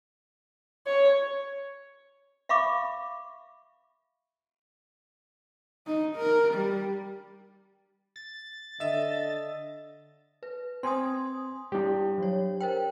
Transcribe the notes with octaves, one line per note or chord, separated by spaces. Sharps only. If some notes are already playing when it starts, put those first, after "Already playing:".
C#5
E5 F5 B5 C#6 D6
D#4
A#4
G3
A6
D3 D#5 E5 E7
B4
C4 G#5 C6 D#6
G3 D4 E4 G4
F#3 C#5
A#4 C5 G5